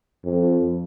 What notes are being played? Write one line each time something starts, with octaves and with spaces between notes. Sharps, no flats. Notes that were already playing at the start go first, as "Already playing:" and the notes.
F2